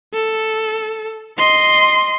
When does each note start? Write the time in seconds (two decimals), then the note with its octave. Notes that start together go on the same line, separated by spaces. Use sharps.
0.13 A4
1.38 D#5 C6